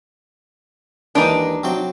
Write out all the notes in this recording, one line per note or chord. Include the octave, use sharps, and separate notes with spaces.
D#2 E3 G#3 D4 D#4
C3 F#3 G5